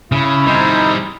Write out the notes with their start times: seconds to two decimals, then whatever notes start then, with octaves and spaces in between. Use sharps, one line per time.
0.12 C#3 E4
0.46 G3 C4 D#4 G#4 C5